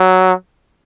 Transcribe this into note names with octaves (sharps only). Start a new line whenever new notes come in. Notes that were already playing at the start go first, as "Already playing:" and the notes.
Already playing: F#3